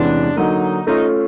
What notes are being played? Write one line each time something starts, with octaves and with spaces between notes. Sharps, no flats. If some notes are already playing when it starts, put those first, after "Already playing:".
Already playing: E2 C3 E3 G#3 C#4 D4
D3 F#3 A#3 D#4
A3 C#4 D#4 F4